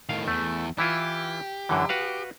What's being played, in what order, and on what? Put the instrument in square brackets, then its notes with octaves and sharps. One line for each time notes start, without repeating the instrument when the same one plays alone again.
[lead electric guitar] A2 D#3 [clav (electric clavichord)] F5
[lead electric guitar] E2 [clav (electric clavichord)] A3
[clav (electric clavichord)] E3 E4 F4 [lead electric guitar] G4
[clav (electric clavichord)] F#2 D3 E3
F#4 B4 F5